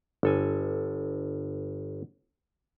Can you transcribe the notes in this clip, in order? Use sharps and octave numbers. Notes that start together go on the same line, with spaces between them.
G1 A4 G#5